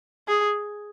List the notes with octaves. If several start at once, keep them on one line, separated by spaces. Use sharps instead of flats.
G#4